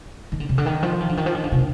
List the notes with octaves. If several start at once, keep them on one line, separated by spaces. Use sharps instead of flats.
D#3
D3
C3
D3
D#3
F3
D#3
D3
D#3
F3
D#3
D3
C3